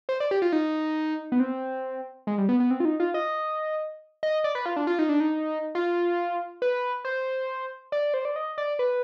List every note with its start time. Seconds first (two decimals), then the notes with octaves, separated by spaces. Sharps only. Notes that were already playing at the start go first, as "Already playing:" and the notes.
0.09 C5
0.20 D5
0.31 G4
0.42 F4
0.52 D#4
1.32 B3
1.40 C4
2.27 G#3
2.38 G3
2.49 B3
2.60 B3
2.71 C4
2.80 F4
2.85 D#4
3.00 F4
3.14 D#5
4.23 D#5
4.44 D5
4.55 B4
4.66 F4
4.76 D4
4.87 F4
4.99 D#4
5.09 D4
5.20 D#4
5.75 F4
6.62 B4
7.05 C5
7.92 D5
8.14 C5
8.25 D5
8.36 D#5
8.58 D5
8.79 B4